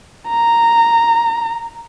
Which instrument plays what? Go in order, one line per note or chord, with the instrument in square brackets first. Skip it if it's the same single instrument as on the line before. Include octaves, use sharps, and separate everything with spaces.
[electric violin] A#5